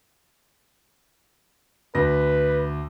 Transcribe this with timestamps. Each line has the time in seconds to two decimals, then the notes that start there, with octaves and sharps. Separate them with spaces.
1.95 D2 B4 A#6